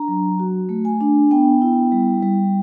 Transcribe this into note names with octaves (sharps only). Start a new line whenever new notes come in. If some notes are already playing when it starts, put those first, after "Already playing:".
Already playing: D4 A#5
F#3
F#4
A3
G#5
D4
B3 G5
E4
G3
G3